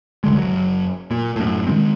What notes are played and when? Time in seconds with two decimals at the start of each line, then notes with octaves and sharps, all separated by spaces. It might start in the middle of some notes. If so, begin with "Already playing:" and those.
0.24 C2 D3 G#3
0.38 F#1 F#3
1.11 A#2
1.36 F#2 A2
1.67 D#3 F3 G#3 C4